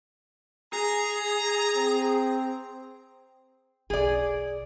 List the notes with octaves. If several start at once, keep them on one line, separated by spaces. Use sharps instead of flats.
G#4 A#5
C4
B1 C#4 G#4 D5